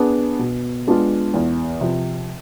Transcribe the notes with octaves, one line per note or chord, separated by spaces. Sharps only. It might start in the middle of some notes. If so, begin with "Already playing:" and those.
Already playing: B3 D4 G#4
B2
G#3 B3 D4 F4
E2
C3 F3